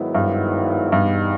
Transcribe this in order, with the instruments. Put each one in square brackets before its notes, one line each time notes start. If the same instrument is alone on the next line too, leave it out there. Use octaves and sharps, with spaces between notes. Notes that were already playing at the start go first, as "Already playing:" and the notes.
Already playing: [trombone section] G#2 D#3 F#3 B3 E4
[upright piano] G2
[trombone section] E2 B2 G3 B3 D#4 [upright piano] G2